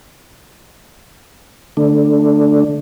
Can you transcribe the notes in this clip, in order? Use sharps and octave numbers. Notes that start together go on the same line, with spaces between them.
D3 A3 D4